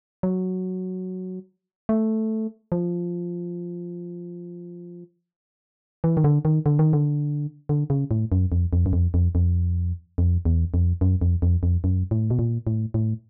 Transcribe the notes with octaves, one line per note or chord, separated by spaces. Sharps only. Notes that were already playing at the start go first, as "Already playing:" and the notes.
F#3
A3
F3
E3
D#3
D3
D#3
D3
D#3
D3
D3
C#3
A2
F#2
F2
F2
F#2
F2
F2
F2
F2
E2
F2
F#2
F2
F2
F2
F#2
A2
B2
A#2
A2
A2